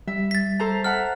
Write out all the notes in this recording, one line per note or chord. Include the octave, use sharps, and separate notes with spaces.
G3 E5
A6 B6
A4 C5 A#5
E5 F#5 A5 A#5 F6